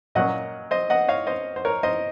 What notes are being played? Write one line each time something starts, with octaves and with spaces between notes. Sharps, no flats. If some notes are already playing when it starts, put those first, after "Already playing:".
A#2 F#3 A#3 C#4 D#5 F#5
C5 D#5
D#5 F#5
C#5 F5
C5 D#5
C5
A#4 C#5
C5 D#5